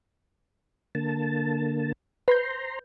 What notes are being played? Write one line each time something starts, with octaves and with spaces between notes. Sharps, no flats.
D3 A#3 A5
B4 C5 A#5 C6 G6